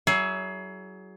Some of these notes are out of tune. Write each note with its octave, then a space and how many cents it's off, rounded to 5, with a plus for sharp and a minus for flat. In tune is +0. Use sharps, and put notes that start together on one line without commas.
F#3 +30 E4 +0 G#4 +25